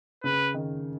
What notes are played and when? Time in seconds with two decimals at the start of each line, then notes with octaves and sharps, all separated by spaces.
0.24 C#3 B4
0.54 D#3